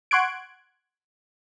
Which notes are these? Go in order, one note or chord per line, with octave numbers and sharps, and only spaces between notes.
F#5 C6 C#6 F#6 G#6 D7